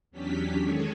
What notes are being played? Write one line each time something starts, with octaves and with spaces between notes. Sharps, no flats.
E2 F#3 C#4 D4 G4 B6
D#3 G#3 C#4 G#4 A4 C#5